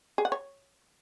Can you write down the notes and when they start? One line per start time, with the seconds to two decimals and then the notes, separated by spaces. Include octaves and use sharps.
0.18 G#4
0.25 F#5
0.32 C#5